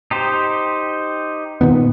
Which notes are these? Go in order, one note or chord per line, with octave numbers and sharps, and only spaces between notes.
D#4 G4 C5
A#2 D#3 B3